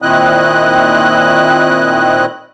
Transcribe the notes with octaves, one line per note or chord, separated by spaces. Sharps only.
A#2 D#3 C4 E4 D#5 F#6